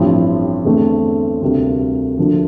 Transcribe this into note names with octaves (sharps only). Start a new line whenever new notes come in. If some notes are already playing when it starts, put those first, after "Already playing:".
Already playing: A1 G2 F3 C4 E4
E2 D3 A3 C4
D2 C3 G3 A#3
D2 D3 F3 A#3